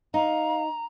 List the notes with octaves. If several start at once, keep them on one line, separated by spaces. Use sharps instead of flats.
D#4 F5 A#5